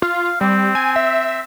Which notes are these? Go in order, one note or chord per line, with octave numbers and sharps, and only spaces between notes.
F4 F5
G3 C4
G#5
E5